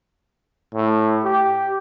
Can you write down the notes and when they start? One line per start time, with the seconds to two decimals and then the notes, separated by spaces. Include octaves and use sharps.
0.74 A2
1.24 G4